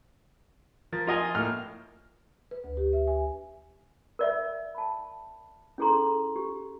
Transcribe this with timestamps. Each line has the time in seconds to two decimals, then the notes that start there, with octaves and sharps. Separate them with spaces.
0.92 F3 A#4 A6
1.07 F4 D#5 G#5
1.35 A2 A#3 F6
2.51 B4
2.64 D2
2.77 G4
2.93 E5
3.07 G#5
4.19 A#4 D5 E5
4.75 A5 B5
5.78 C#4 E4 G#4 A4 A#5 C6
6.36 G4